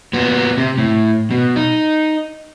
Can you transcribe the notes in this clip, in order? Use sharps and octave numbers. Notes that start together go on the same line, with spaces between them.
A#2 B3
C3
A2
B2
D#4